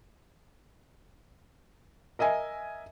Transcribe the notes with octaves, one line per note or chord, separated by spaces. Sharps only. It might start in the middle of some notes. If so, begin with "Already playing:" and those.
A#4 D#5 E5 G#5